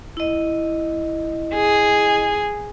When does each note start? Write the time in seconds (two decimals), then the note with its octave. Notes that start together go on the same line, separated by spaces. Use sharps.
0.17 E4 D#5
1.54 G#4